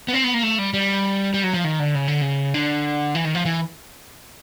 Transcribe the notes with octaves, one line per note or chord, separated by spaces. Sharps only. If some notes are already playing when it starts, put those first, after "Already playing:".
B3
C4
B3
A#3
A3
G3
G3
G3
F#3
F3
D#3
D3
C#3
D3
C#3
D3
E3
D#3
F3
E3